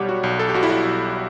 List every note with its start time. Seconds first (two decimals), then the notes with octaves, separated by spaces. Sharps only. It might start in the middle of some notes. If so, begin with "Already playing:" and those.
Already playing: B1 G3 G4 C#5 D5 F#5
0.09 F#4
0.24 B1
0.39 A4
0.49 G4
0.54 B1 F#4
0.63 E4
0.70 F#4
0.85 B1